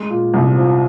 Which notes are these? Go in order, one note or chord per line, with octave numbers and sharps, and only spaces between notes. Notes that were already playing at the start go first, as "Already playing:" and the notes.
Already playing: G#3
A#2
C2
F3